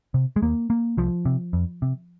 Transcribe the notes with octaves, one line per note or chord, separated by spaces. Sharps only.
C3
G#3
D#2 A#3
A#3
C2 F3
C3
F2
C3